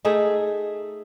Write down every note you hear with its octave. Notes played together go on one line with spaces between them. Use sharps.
A3 D#4 G#4 E5